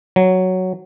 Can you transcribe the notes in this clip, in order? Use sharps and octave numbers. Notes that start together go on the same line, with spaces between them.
F#3